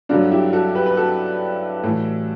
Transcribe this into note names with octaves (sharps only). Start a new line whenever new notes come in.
G2 D3 F#3 D4 F#4
E4 G4
F#4 A4
G4 B4
B4
F#4 A4
A2 E3